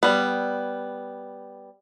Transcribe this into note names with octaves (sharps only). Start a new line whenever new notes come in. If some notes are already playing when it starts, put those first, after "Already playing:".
G3 B3